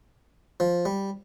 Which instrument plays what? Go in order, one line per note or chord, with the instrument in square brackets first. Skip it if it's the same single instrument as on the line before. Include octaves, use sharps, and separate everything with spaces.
[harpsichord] F3
G3